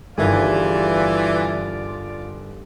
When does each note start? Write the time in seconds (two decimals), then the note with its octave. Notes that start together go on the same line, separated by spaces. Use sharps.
0.18 G1 G2 D#3 E3 F4 G#4 D5